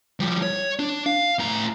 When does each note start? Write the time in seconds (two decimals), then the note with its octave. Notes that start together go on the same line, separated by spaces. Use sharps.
0.20 F3 G3
0.42 C#5
0.79 D4
1.06 F5
1.39 A2 A#5